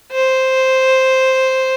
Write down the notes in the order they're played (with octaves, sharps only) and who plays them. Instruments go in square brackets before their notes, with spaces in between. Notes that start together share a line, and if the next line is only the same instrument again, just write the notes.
[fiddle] C5